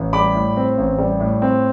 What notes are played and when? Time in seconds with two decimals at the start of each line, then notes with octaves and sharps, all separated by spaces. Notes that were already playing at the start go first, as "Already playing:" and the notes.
Already playing: A1
0.13 G3 B5 D6
0.35 A2
0.57 C4
0.78 A1
0.98 G3
1.20 A2
1.42 C4